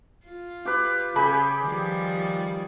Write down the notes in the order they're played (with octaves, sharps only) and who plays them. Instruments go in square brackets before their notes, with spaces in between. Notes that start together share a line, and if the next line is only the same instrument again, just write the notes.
[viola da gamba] F4
[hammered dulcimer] G4 B4
[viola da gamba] C#3 [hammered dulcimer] G4 G#4 [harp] B5
[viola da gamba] D#3 F3 G3